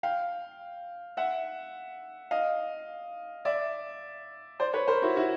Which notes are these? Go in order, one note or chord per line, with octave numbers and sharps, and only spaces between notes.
F5 G5
E5 F#5
D#5 F5
D5 E5
C5 D5
B4 C#5
A#4 C5
E4 F#4
E4 F#4